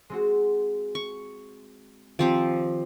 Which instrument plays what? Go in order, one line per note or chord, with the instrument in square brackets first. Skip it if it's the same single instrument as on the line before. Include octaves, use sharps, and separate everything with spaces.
[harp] G#3 C4 F#4
[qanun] C#6
[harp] D#3 [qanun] F3 C4 G4